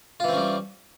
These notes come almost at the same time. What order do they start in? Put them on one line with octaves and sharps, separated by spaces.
F4 E3 C4 C#4 G3